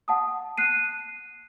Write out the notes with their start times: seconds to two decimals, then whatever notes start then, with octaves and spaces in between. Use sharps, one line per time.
0.08 F#5 A5 D#6
0.57 F#6 C7 D#7